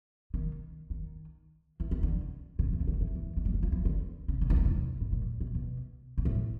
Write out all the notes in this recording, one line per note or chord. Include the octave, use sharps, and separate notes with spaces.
D#3
D#3
E3
D#3
D3
C#3
C3
C#3
D3
E3
E3
G#3
G3
F#3
F3
E3
D3
C#3
D3
E3
D#3
C#3
D3
A2
A#2
A#2
B2
G#2
A2